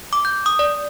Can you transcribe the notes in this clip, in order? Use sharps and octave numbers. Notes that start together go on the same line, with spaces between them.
D6
G6
D#6
D5